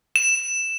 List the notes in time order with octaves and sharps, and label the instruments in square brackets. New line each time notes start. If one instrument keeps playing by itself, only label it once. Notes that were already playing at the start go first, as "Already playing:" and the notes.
[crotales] E7